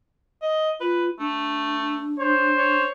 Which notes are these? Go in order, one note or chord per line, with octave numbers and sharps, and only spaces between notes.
D#5
F4 B4
A3 D4
C5 C#5
C#5